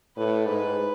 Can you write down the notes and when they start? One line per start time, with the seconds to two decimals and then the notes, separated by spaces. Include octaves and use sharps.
0.17 A2 B4
0.46 G#2 B4